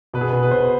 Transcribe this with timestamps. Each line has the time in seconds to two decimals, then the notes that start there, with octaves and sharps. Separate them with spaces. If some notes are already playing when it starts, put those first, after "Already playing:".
0.14 B2 B4
0.21 G#4
0.29 B2 B4
0.43 B4
0.51 B2 C5
0.60 B4